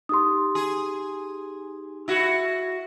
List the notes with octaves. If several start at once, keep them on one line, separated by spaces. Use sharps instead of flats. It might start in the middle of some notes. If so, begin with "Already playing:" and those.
D#4 G4 C6 D#6
G#4
E4 F#4